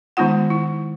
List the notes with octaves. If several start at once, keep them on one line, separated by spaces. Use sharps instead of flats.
D#3 G#3 B3 D#4 F4 F#5
E4